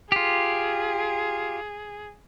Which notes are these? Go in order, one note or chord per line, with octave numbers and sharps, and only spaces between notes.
F4 G4 G#4